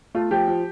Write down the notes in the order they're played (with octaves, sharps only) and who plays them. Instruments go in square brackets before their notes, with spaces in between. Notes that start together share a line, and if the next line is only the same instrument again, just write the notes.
[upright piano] A3 F4
F3 G4
F3